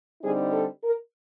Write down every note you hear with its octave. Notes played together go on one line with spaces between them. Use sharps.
D3 G3 C4 D#4 G#4
A4
A#4